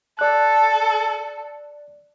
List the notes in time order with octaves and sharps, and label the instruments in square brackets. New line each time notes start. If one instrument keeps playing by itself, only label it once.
[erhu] A4 [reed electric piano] D5 F#6